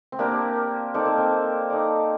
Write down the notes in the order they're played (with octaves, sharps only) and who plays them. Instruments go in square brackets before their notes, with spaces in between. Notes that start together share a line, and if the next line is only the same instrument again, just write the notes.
[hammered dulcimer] C4
[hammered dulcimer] A#3 [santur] D4 G4 A#4
[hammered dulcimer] C4 [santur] D#4 A4 D5
[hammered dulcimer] A#3
C4
[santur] D#4 A4 D5